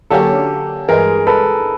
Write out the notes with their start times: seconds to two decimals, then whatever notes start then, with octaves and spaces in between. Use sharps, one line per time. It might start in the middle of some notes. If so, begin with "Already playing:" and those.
0.10 D3 F#3 A#3 C#4 G4 A4
0.88 G2 E3 G#3 G#4 A#4
1.27 A4 B4